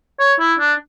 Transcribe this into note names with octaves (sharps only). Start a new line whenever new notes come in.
C#5
E4
D4